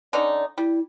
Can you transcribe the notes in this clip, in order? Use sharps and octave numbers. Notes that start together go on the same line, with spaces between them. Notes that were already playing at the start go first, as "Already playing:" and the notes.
D3 C#4 D#4 D5
G3 E4